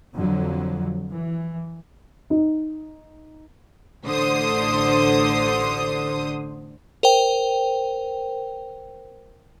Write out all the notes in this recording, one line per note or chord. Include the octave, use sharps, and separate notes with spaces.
F2 D3 F#3
E3
D#4
A1 D3 C5 D#6
A#4 C5 G5